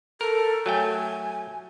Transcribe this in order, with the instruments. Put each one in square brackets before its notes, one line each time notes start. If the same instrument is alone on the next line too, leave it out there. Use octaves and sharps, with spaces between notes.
[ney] A4 [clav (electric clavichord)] A#4
[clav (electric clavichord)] F#3 A3 G5 [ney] G#5